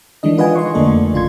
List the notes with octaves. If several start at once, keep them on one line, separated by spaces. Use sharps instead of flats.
D#3 E3 G#3 D4 D#5
F4 B4 D#5 F#5 G#5
D#5 C6 C#6
F2 D3 A3 A#3 A4 D5
G#1 C#3 F4 C6 G#6